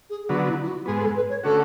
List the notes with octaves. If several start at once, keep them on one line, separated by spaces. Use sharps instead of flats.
G#4
D3 F#3 B3 F#4
E4
E4
F#4
G#2 G#3 B3 G#4
A4
B4
C#5
D3 A3 C#4 F#4 A4